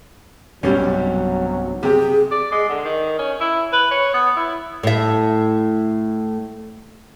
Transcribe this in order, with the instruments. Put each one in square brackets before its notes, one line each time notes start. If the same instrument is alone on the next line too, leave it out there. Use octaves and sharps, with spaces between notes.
[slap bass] B1 G2 C3 [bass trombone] F#3 [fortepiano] G3 C#4
[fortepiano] C3 G4 [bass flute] G#4
[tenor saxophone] D5
G#3
D3
D#3
C#4
E4
B4
C#5
B3
E4
[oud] A2 E5